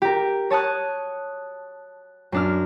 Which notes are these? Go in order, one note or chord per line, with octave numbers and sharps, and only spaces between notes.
G4 A#4
C#5 A5 D#6 F#6
F#2 D4 F6